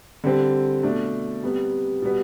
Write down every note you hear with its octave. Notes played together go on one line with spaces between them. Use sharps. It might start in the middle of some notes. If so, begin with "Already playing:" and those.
D3 G3 C4
B2 A3 D4
C3 G3 B3
B2 G3 B3